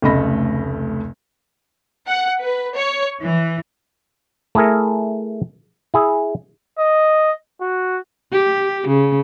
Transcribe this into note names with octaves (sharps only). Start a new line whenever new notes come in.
F1 C#2 A3 D#5 B5 A#6
F#5
B4
C#5
E3
A3 E4 G#4 A#4
E4 G#4
D#5
F#4
G4
C#3